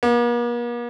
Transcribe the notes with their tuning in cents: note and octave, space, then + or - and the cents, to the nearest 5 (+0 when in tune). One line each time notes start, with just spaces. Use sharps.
A#3 +45